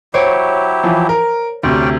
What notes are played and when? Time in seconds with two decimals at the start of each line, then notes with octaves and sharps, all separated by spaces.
0.14 F#3 E4 G4 C5 C#5 D7
0.83 E3 F3
1.09 A#4
1.63 D2 C3 C#4 D5 G5